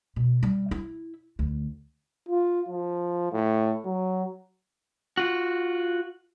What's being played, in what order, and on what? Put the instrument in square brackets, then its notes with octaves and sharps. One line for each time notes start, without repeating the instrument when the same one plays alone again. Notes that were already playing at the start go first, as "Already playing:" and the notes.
[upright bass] B2
G3
E4
D2
[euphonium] F4
F3
A2
F#3
[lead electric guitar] F4 F#4